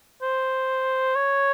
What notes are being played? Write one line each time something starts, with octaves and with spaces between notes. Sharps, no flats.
C5
C#5